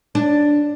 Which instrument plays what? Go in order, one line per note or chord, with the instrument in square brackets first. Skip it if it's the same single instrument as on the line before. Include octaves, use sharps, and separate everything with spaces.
[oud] D4